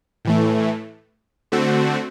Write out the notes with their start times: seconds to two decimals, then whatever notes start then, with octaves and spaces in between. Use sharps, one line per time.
0.25 A2 E3 A3
1.52 D3 A3 C4 F#4